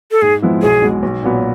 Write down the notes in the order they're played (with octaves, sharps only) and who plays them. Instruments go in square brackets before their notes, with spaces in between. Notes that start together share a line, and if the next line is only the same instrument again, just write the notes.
[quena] A4
[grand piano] G#2 [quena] G#4
[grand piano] F3 G#3 B3 E4
[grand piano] B1 [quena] G#4
[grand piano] B2 G#3
B1
A#2 F#3 B3